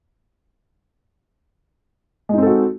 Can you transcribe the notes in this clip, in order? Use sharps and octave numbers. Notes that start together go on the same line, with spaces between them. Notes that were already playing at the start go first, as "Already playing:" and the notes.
G#3 C4 D#4 F#4 A4